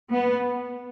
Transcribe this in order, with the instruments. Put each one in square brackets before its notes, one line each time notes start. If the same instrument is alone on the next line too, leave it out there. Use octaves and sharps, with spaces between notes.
[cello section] B3